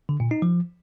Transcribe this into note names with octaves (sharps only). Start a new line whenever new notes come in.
D3
A#2
D#4
F3